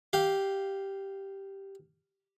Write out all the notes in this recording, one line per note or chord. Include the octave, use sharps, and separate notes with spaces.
G4 F5